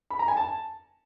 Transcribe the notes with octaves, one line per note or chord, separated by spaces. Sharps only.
B5
A#5
G#5
A5